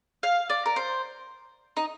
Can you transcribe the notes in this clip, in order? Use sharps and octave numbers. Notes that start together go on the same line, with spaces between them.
F5
D5
A#4
C5
D#4